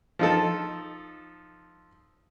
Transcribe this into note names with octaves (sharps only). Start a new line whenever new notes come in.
F3 D#4 A4